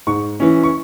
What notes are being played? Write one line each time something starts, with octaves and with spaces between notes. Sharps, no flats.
G#2 C#6
E3 C#4
C#6